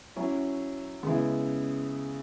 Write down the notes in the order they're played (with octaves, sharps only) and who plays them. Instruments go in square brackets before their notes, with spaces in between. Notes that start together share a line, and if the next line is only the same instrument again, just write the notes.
[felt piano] F#3 C#4 E4
C#3 G#3 B3 E4